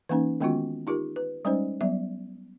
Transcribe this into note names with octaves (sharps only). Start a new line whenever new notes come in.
E3 A#3 C#4 D#4
D#3 G#3 B3 C#4 F4 F#4
D#4 F4 G4 A#4
B4
G3 G#3 C#4 D#4 C5
F#3 G3 B3 E5